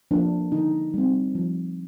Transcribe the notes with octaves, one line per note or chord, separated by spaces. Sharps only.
F3 A#3 D4
D3 D#4
G3 C4
F3